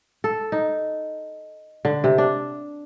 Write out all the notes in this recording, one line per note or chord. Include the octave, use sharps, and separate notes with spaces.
A4
D#4
D3
C3
D4